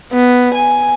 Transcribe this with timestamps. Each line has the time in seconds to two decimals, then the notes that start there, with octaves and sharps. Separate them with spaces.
0.13 B3
0.55 G#5